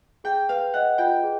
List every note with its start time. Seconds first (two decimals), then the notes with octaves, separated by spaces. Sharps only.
0.24 G#4 G5
0.49 B4 F5
0.74 D#5 F#5
0.98 F4 G5
1.24 G#4